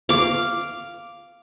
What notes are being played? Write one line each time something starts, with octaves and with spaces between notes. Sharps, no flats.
F5 D6